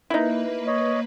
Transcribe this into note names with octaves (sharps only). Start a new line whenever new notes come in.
A#3 D#4 E4 B4
C#5 D#5